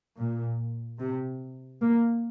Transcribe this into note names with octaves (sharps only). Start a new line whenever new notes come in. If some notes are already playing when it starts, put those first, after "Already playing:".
A#2
C3
A#3